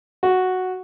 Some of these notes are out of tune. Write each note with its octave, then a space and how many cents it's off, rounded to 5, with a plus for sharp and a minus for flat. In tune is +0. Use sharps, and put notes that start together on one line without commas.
F#4 +0